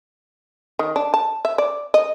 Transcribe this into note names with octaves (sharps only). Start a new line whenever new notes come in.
D#3
D4
A5
E5
D5
D#5